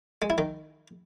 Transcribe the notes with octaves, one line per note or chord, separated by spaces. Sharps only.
G#3
E4
D#3